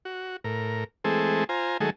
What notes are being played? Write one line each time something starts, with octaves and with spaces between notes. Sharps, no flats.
F#4
A2 A#4
E3 G#3 A3 C4 G#4 A4
F4 C5 G#5 A#5
D#3 F#3 G#3 A3 G#4 A4